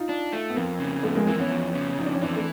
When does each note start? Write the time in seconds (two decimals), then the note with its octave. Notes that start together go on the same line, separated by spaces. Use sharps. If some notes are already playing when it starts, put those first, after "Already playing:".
Already playing: D#4 F4
0.09 D4
0.33 A3
0.50 B3
0.56 F2 A#3 C4
0.80 C#3
1.03 F2 A3 B3
1.15 G#3 A#3
1.27 E3 A#3 C4
1.39 B3 C#4
1.51 F2
1.74 C#3
1.98 F2 D#4
2.06 D4
2.13 C#4
2.22 E3 C4 D4
2.36 A3